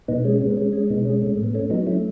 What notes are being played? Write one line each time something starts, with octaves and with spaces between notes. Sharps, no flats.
B2 B3 D#4
G#3 C#4
C#4
G#3
B3
G#3 C#4
G#3 C#4
B2 B3 D#4
G#3 C#4
A3 C#4
A2
B3
A3 C#4
F#3 B3 D#4
A3 C#4 E4